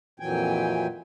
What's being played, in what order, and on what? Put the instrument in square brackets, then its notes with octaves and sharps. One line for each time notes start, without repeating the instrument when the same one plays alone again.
[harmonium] F2 A#2 E3 F#3 G5 G#5